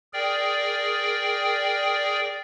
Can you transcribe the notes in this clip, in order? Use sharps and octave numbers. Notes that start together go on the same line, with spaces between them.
G#4 A#4 D5 G5